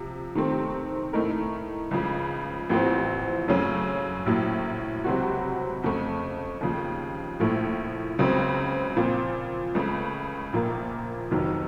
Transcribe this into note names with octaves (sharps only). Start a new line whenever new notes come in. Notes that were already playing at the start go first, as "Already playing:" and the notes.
Already playing: C3 F3
C3 D#3 A3 C4
A2 A3 D#4 A#4
C#2 C#3 F3
A1 A2 F3 C4
F#2 C#3 A3 C#4
A#1 A2 F#3
C#2 C3 F#3 C4 F#4
F2 C#3 A3
D#2 C#3 F3
A#1 A2 F3 A3
C#2 C#3 F#3 C4
A#2 F3 C4 F4
C#2 C#3 A3
A#1 A#2 F3 A#3
F1 F2 D#3 F#3